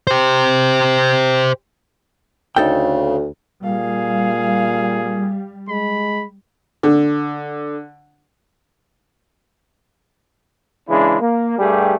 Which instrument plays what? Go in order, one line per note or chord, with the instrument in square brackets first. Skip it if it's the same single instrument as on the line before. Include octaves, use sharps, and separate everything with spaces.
[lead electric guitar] G4 C5
[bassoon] D2 [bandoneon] C#3 [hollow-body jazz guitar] D#4 A4 G5
[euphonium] A#2 [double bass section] G3 [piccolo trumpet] G#4 [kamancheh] F5
[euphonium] G#3 [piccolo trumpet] B5
[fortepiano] D3
[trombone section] C#3 E3 G#3 D4 E4
A#3
G2 G3 A3 G4 G#4